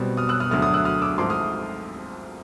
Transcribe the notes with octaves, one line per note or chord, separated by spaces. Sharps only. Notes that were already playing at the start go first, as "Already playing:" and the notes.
Already playing: B1 B2 G3 C4
D#6 F6
E6 F#6
D#6 F6
D2 D3 F#3 A3 D#6 F6
D#6 F6
E6 F#6
D#6 F6
D6 E6
G#1 G#2 F3 A3 C6 D6
D#6 F6